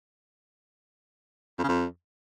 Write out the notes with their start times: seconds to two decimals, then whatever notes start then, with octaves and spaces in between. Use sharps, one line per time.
1.59 F2
1.64 C#3
1.69 F2